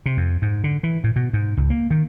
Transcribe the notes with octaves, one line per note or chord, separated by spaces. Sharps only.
C3
F2
G#2
D3
E3
A2
B2
G#2
C#2
A#3
D#3